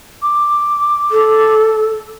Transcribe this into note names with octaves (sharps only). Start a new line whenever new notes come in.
D6
A4